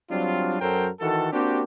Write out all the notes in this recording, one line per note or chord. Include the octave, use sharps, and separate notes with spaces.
F#3 G3 C4 D4 F4
F#2 F#3 A4 A#4 C5 G5
D#3 E3 F#4 A4
A#3 C4 D4 F#4 G4